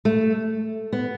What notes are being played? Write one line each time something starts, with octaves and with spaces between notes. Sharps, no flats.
A3
B3